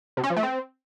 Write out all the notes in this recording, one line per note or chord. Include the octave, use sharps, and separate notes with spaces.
C3
C#4
F3
A3
C4